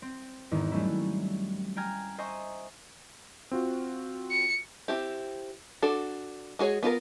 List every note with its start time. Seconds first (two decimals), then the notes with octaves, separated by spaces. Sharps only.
0.02 C4
0.51 E2 G#2 D#3 D#4
0.72 F#3 G3 A3 C#4 E4
1.76 G5 G#5 A#5 F6 G#6
2.18 C5 D#5 E5 G#5 A#5 C#6
3.51 C4 F4 F#4
4.31 C#7
4.88 C4 E4 G4
5.82 D4 F#4 A4
6.59 G#3 F#4 G#4 C#5
6.83 B3 F4 F#4 A#4